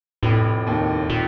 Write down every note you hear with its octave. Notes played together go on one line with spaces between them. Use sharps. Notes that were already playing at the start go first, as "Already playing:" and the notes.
F1 A2
D#2 D#3
A#2